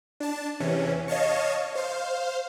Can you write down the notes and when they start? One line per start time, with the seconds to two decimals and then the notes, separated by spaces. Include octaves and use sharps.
0.20 D4 A5
0.60 E2 C3 E3 C#4
1.08 C#5 D#5 F5 A5 C#6
1.75 C5 F5